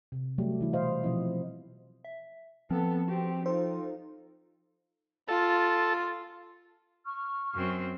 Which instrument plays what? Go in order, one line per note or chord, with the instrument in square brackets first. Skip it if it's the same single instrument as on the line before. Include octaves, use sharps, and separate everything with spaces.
[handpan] C3
F#3 G3 A3 G4
E3 E4
B2 C5 D#5 F5
B2 F3 F#3 C4 E4 D#5
[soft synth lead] E5
[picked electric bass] F3 [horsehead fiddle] B3 A4 [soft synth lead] C4
[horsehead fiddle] C4 G4 [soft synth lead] F#4
[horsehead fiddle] D#4 F4 [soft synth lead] A4 [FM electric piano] C5
[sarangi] F4 [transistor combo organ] A4
[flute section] C#6 F6
[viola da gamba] F#2 C4